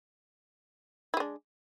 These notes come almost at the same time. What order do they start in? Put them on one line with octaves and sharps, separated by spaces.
E4 G#3 D4